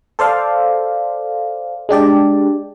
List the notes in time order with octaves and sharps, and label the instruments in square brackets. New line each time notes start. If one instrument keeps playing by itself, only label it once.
[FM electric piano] A4 C5 D5 F5
G#3 D4 G4 D5